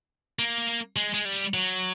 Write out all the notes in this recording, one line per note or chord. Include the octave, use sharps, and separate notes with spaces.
A#3
G#3
G#3
G3
F#3